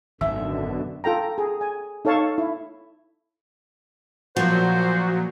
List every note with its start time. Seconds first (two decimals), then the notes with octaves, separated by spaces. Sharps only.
0.21 G#1 F#2 B2 D3 D#3 E5
1.04 F4 A4 G5 A#5
1.38 G#4
1.61 G#5
2.05 D#4 A4 C#5 F5 A5 C#6
2.38 E4
4.36 A#2 F3 F#3 F#4 C5